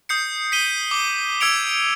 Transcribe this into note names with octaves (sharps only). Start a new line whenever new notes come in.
D#6 G6 C7 C#7
B6 C7 D#7 G7
D6 G7
D6 E6 G#6 C#7 D7 F7